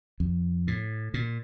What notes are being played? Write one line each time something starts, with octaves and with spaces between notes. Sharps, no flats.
F2
A2
A#2